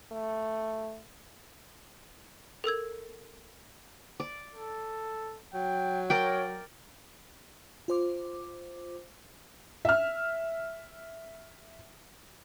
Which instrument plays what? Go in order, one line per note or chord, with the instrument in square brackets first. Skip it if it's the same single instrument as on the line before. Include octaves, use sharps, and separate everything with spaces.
[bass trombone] A3
[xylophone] A4 A#4 E6 G#6
[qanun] D5
[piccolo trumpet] A4
[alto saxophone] F#3 [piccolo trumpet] G5
[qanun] A#4 D5 G5 [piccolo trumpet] C#5
[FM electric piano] F4 C5 D6
[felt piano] E5 F6